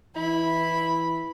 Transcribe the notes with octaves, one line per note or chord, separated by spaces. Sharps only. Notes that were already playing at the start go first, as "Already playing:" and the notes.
E3 E4 B5